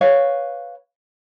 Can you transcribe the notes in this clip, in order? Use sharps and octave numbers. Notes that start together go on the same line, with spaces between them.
B4 C#5 F5